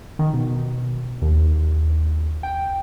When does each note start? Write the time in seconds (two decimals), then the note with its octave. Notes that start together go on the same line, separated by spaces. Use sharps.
0.19 D#3
0.34 B2
1.22 D#2
2.43 G5